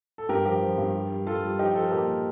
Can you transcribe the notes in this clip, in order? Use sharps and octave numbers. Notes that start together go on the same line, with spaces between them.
A4
G2 G4 A#4
F3 G4 A#4
F3
G2
G3
G3
G3 F4 A4
G3
F3 D#4 G4
F3 F4 A4
A4
A#2 G4 A#4
A#2